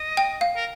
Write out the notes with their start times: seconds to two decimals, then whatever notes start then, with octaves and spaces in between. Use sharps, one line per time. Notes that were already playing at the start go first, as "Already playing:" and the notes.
Already playing: D#5
0.17 G5
0.41 F5
0.57 A#4